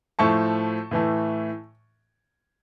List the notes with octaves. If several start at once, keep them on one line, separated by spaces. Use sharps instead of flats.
A2 F3 A3 A5 C#6
A2 E3 A3